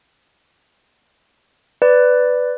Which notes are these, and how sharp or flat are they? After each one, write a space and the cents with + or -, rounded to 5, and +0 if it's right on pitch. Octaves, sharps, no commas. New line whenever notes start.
B4 +10 D5 +0